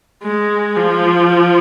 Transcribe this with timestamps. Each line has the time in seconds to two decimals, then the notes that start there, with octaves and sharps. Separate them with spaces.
0.23 G#3
0.77 F3